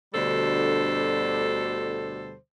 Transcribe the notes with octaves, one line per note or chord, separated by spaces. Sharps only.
D2 B2 D3 G3 A4 C5